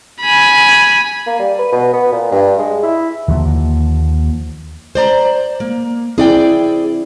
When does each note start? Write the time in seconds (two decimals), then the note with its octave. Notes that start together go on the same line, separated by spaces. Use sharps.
0.21 G#5 B5
1.27 A#3
1.39 G3
1.59 B4
1.72 B2
1.93 B3
2.12 A#2
2.32 G2
2.58 G#3
2.83 E4
3.28 D#2 D3 F3 A#3
4.95 C5 D5 A#5
5.60 A#3
6.18 C4 E4 G#4 D5 G5